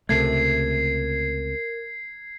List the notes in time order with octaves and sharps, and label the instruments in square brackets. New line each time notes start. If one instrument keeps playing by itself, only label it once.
[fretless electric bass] C#2 C3 A3 [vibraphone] A#4 [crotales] G#6 C7